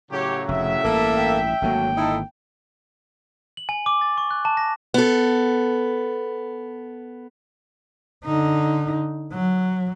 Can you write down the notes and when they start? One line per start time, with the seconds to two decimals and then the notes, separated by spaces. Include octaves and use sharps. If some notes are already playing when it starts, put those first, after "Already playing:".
0.11 A2 C#3 F#3 G4 C#5
0.49 F1 E5
0.84 A1 G2 A#3 A4
1.17 G5
1.62 G#1 D3 F#3 A3 A#3
1.97 D#4 E4 A4
3.57 F#7
3.69 G#5
3.86 D6
4.01 A6
4.18 C#6
4.31 F#6
4.45 A5
4.57 A#6
4.94 B3 A4
8.25 D3 D#4
9.33 F#3